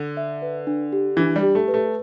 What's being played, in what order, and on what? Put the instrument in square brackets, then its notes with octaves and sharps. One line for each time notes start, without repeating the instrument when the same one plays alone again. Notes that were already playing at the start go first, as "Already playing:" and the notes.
Already playing: [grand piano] D3
[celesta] E5
B4
D4
G4
[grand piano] E3 [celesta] D4
[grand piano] G3
[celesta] G4
[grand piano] A3
[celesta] B4
[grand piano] A3